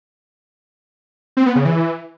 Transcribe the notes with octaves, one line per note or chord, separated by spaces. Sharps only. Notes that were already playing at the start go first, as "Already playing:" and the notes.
C4
B3
C#3
E3